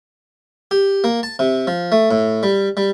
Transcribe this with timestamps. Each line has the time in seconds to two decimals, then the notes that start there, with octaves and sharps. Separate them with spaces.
0.71 G4
1.04 A#3
1.23 A5
1.39 C3
1.67 F3
1.92 A3
2.11 A2
2.43 G3
2.77 G3